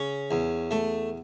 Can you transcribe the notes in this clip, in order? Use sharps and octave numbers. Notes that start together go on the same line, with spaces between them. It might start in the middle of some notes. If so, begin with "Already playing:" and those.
Already playing: C#3 C#4
E2
A3